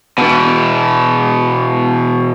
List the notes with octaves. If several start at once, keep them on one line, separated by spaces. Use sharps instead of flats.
B2 E3